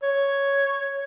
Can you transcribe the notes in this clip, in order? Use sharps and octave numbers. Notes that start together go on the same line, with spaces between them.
C#5